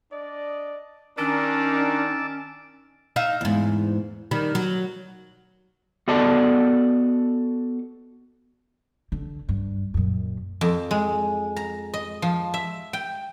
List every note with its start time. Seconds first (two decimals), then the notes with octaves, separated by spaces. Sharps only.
0.11 D4 D5 D#5
1.18 D#3 C#4 D4 A#4 A5 D6 E6
3.16 D#4 E5 F5
3.41 E2 G#2
4.31 D#3 G3
4.55 F#3
6.08 B3 F#4 A4 D5 D#5 A5
9.12 D3
9.49 G2
9.94 F#2 A#2
10.61 F2
10.91 G#3
11.56 A#5
11.94 D#5
12.22 F3
12.54 E5
12.93 G5